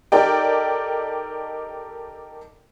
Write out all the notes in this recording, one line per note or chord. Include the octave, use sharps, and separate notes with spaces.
D#4 G4 A4 A#4 D5 G5